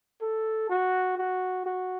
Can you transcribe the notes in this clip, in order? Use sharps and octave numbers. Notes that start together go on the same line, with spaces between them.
A4
F#4
F#4
F#4